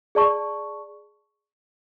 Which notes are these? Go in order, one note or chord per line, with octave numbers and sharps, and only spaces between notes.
G#4 D5 A5 C#6